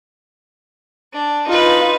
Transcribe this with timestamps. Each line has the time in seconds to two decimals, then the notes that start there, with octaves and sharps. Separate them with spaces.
1.13 D4
1.47 D#4 F4 B4